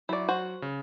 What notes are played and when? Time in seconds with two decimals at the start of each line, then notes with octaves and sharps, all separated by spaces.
0.09 F#3 E4 D5 C#6
0.29 F#4 C5
0.62 C#3